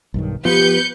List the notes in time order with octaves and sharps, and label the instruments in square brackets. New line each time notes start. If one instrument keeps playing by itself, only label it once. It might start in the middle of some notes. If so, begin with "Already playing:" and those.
[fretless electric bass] B1 G2 D#3
[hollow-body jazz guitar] F3 [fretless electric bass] B3 [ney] G4 [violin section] B4 G6 C#7